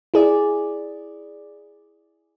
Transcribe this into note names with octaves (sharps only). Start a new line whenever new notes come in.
E4 G#4 D5